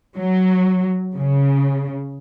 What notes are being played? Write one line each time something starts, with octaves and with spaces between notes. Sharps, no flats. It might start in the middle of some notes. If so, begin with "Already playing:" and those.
F#3
C#3